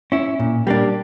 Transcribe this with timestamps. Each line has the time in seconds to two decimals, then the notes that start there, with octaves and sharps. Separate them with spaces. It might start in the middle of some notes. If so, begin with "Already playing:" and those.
0.12 C#4 E4
0.39 A#2
0.67 G3 A#3 D4